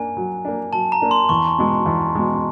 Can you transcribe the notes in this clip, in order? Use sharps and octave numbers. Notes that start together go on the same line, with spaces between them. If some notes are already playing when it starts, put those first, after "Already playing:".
Already playing: A#3 D4 G#5
F#3
A#3 D4
F#3 A5
A#5
A#3 D4
C6
E2 C#6
B2 G#3
E2
B2 G#3